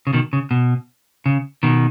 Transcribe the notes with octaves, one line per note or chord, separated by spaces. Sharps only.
C#3
B2 D#3
C#3
B2
C#3
B2 D#3